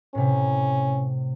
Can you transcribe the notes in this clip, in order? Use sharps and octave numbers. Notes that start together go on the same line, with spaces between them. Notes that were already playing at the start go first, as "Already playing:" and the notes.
A2 C3 C#4